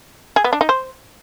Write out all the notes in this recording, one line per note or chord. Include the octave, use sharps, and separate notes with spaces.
G#4
B3
D4
D#4
C5